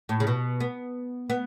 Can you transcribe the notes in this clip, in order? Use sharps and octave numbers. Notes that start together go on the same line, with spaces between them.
A2
C#3
B2
B3
B3